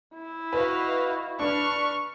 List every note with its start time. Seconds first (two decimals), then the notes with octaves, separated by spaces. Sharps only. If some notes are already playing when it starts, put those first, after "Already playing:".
0.15 E4
0.53 F#4 B4 D#5 F5
1.39 D4 B4 C#6 F6